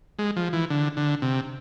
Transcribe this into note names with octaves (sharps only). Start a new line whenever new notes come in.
G#3
F3
E3
D3
D3
C3